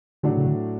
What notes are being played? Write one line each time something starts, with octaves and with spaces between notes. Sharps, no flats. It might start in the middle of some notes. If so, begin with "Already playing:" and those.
A2 D3 F#3 A3 D4 F#4
C#3
D3